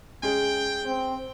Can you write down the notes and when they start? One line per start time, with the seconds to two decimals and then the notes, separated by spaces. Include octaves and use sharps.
0.23 G#3 C#4 G#4 G5
0.86 C4